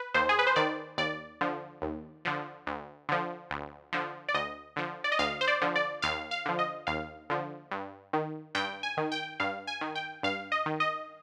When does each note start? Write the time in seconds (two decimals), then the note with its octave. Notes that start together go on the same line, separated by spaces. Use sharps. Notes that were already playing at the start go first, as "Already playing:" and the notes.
Already playing: B4
0.14 D#2 C5
0.29 G#4
0.39 B4
0.47 C5
0.56 D#3 D5
0.98 D#2 D5
1.41 D3 F3
1.82 D#2
2.25 D3 F3
2.67 D2
3.09 D3 F3
3.50 D2
3.93 D3 F3
4.29 D5
4.34 D2 D#5
4.76 D3 F3
5.04 D5
5.12 D#5
5.19 D2 F5
5.41 C5
5.48 D5
5.62 D3 F3
5.76 D5
6.02 D#2 F5
6.31 F5
6.46 D3 F3
6.59 D#5
6.87 D#2 F5
7.30 D3 F3
7.71 G2
8.13 D#3
8.55 G2 G5
8.83 G#5
8.97 D#3
9.12 G5
9.40 G2 F5
9.67 G#5
9.81 D#3
9.95 G5
10.23 G2 F5
10.52 D#5
10.66 D#3
10.80 D#5